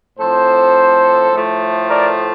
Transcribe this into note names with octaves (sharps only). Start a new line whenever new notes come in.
A2 F3 C4 A4 C5
A2 F3 A3
A#4 D5